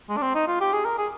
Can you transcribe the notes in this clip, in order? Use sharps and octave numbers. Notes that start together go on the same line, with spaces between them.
G#3
D4
C4
D#4
F4
G4
G#4
A#4
G#4